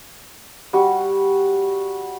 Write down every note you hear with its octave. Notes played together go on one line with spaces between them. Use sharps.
G3 F#4